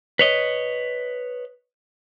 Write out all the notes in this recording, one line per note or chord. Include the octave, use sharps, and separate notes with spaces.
B4 C#5 D#5